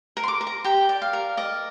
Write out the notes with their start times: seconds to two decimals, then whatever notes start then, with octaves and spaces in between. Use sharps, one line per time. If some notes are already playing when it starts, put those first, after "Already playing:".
0.17 A#4
0.23 C6
0.28 D6
0.41 A#4
0.47 A#5
0.64 G4 G5
0.89 D5
1.02 F5
1.13 A#4
1.37 D5 D#5